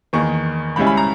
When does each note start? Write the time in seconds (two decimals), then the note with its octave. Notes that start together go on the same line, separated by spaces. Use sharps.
0.13 E2 D#3 A#3 C#6
0.76 C#2 C#3 G3 C#4 E4 B5
0.87 B5
0.97 A#5